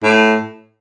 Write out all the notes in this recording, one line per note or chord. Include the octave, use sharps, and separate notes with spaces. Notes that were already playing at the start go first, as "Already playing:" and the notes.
A2